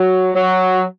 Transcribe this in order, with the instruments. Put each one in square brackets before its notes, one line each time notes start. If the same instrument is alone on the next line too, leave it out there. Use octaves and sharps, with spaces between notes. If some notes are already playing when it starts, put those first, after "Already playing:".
Already playing: [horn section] F#3
F#3